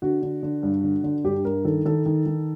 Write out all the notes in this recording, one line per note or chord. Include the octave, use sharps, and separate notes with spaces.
D3 F#4
D3
D3
G2
D3
D3
G2 G4
G2 A#4
D#3 A4
D#3 A4
D#3
D#3